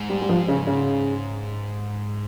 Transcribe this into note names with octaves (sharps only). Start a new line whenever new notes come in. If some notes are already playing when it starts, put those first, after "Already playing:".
Already playing: G#2
G3
G3
F3
C#3
C#3